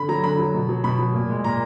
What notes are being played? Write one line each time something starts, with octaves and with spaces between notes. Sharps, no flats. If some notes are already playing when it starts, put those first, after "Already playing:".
Already playing: D3 B5
F#3 A#5
D3 B5
F#3
B2
F#3
B2 B5
F#3
A#2
G#3
A#2 A#5